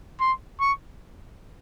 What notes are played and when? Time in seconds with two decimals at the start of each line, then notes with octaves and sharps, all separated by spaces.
0.20 C6
0.60 C#6